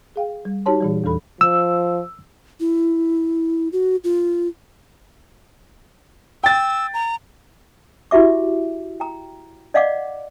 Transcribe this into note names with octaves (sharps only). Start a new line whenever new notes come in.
G#4 F5 G5
G3
D#4 F#4 G4 C#5 A5 C6
A#2 E3 G3
E2 A#2 E3 A4 B5
F3 E6
E4
F#4
F4
G5 E6 A6
A#5
E4 F#4 G4 E5 D6
G5 A#5
D5 D#5 F5 F#5 D6